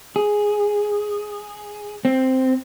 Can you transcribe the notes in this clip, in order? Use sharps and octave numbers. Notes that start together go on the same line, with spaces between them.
G#4
C4